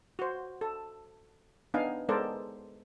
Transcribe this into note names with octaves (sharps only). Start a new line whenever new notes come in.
F#4 C5
A4
B3 D4 D#4 F5 G#5
G#3 B3 A4 A#4 C5 D5